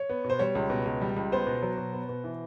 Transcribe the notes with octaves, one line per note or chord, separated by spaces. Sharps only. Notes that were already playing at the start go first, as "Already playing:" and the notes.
Already playing: C#5
B3
B2
C5
G3 C#5
C#2
B2
C#2
G3
C#2
B3 C5
B2
F#3
B2
B3
B2
E3